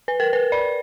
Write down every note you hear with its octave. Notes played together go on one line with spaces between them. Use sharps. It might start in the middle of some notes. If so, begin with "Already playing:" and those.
B4
A#4
B4
D5